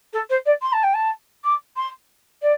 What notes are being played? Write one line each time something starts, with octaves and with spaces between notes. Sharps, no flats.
A4
C5
D5
C6
A5
G5
A5
D6
C6
D5